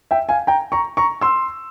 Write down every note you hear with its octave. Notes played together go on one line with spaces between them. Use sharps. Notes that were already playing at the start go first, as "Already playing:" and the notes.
E5 G5
F5 G#5
G5 A#5
A#5 C#6
A#5 C#6
C6 E6